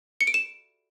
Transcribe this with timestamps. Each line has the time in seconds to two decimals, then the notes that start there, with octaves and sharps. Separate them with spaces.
0.21 C#7
0.27 D7
0.34 E7